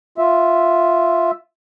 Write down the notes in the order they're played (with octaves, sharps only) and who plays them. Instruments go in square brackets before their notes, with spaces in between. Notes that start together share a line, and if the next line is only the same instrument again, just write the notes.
[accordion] F4 E5